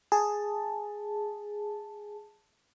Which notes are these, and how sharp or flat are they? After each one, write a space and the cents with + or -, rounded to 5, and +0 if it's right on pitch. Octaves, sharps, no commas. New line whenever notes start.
G#4 +0 A5 +0